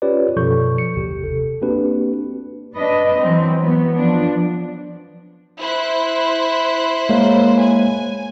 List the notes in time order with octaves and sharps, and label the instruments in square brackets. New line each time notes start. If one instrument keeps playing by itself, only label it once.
[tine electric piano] C#4 F4 G4 B4 C#5 D5
F#2 B2 F3 A4 C#6 G6
C#7
G1 D#2 C3 G4
A4
A#3 C4 D4 F#4 G4 B4
[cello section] D4 B4 D#5
E3 F#3 C4
F#3 B3
F3 D4
[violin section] E4 C5 F#6
[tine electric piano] G#3 A#3 C#5
[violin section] G#5